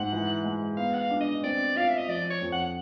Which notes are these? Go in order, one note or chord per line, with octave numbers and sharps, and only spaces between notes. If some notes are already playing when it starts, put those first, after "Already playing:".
Already playing: G#2 F#5
E3
G#3
B3 F5
F#5
F5
D4
D#5
C4 D5
F4 F5
E5
D#5
F3 D5
C#5
F2
F#5